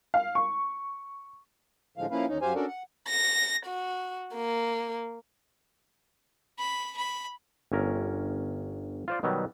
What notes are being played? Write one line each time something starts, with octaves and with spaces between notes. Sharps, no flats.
F5
C#6
A2 D3 F3 G#3 F5
F3 A#3 C#4 E4 B4 F5
D#2 C#4 D#4
F#2 F#3 G4 C5 F5 G#5
C#4 D4 F#4 A4 A#4 D5
F#5
A#6
F#4
A#3
B5
B5
G1 C#4 A#4
F4 C5 D5
B2 D#3 F#3 G3